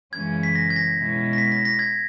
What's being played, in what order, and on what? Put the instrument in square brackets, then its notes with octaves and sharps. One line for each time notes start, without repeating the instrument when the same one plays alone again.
[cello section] F#2 C#3 E3 G#3 C#4 [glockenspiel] G#6
[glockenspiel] B6
A#6
G#6
A#6
[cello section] B2 G#3 C#4 E4
[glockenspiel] A#6
B6
A#6
A#6
G#6